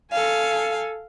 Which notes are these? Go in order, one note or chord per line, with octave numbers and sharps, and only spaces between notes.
A4 F5 G#5